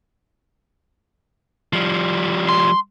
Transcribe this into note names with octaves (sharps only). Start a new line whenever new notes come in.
F3 G3
C6